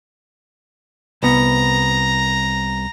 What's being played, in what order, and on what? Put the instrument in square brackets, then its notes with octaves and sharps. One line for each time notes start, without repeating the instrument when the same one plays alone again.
[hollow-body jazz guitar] C2 B3 [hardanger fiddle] A#5